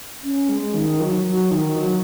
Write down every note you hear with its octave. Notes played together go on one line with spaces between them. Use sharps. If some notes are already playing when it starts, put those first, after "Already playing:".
C#4
G#3
D#3
F#3
F#3
D#3
F#3